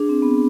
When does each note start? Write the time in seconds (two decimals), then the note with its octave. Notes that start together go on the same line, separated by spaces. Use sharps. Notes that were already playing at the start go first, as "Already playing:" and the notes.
Already playing: D4 G#4
0.09 C4
0.22 B3